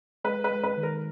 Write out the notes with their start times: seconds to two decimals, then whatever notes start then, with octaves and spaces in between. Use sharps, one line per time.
0.24 G#3 B4
0.44 B4
0.51 G#3
0.63 B4
0.77 D#3
0.83 A#4